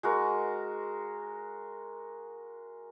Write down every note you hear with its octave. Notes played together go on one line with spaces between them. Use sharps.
G#3 F#4 A#4